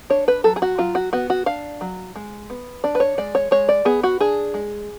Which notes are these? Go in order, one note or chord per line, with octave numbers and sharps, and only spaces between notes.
D4 C#5
B4
F#3 A4
G#4
F#4
F#3 F4
F#4
B3 F#4
F#4
D4 F5
F#3
G#3
B3
D4 D5
B4
C#5
G#3 D5
C#5
G#3 C#5
D5
B3 G#4
F#4
D4 G#4
G#3